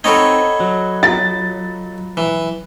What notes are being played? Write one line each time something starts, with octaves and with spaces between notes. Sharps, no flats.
C4 D#4 A4 C#5 D#5 F#5 B5 G#6
F#3
F4 A#5 A6
E3